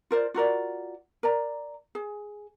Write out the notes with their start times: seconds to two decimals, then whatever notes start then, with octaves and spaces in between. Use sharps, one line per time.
0.11 F4 A#4 C5 D5
0.34 F4 F#4 A#4 D5
1.23 A#4 D5 A#5
1.95 G#4